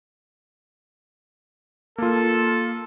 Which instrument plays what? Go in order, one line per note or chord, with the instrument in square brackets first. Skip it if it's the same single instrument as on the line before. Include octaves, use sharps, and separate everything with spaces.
[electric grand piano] A#3 F4 [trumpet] A4